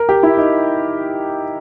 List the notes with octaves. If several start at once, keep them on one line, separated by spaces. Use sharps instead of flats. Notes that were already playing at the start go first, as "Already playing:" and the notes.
Already playing: A#4
G4
E4
D#4